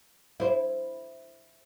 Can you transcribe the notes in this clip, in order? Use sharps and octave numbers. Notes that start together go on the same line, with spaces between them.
E4 C5